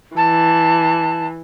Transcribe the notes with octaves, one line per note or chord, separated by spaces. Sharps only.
E3 A5